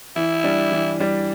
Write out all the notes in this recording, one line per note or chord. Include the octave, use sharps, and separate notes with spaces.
E3 E4
G3 D4
E3
G3 D4